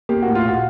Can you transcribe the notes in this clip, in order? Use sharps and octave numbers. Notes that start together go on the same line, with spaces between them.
A#3 G4
A2 F#4
F4
A#2 F#4